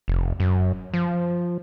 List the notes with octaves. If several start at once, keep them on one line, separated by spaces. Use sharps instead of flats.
F1
F#2
F3